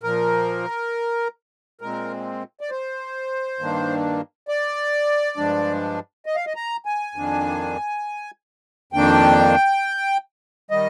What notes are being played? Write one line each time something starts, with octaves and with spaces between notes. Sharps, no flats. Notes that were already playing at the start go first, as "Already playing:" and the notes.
A#2 F3 A#3 A#4
A#2 G#3 C4 A#4
D5
C5
G2 D#3 A#3 D4
D5
G2 F3 G#3 D4
D#5
F5
D#5
A#5
G#5
F2 D#3 A#3 D4
F2 D#3 A#3 D4 G5
D#3 G3 D#5